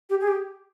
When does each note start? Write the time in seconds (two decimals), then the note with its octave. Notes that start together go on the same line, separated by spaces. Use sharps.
0.09 G4
0.21 G#4
0.28 G4